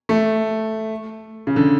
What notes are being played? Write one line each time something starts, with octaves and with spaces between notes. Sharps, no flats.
A3
C#3
D3